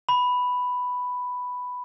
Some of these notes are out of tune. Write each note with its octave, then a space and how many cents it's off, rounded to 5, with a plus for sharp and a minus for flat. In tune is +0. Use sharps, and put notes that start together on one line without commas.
B5 +5